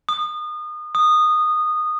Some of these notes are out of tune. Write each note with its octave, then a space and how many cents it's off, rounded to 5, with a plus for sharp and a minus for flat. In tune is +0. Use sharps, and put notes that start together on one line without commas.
D#6 -30
D#6 -15